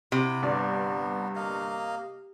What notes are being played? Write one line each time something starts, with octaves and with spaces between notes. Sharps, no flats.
C3 E4 F#4
G1 G2 B3 D5
A#3 D#5 F5